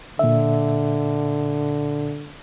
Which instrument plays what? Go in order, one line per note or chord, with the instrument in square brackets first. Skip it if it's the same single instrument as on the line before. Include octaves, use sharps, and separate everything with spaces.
[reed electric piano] A#2 E5 [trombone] D3